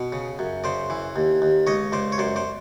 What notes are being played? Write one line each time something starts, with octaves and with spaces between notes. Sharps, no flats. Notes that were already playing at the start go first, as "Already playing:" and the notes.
Already playing: B2
C#3
F#2
C#3 C5 D5
E3
D#2
D#2
C#2 C#5 D#5
C#2 C5 D5
C#5
F#2 C5 D5
C5 D5